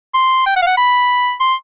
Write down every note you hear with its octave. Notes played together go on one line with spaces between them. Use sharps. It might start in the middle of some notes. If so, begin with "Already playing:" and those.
C6
G5
F#5
F5
F#5
B5
C6